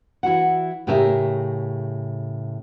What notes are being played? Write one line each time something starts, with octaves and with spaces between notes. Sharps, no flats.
E3 E4 F#4 F#5
A2 C#3 G4 G#4 A#4 E5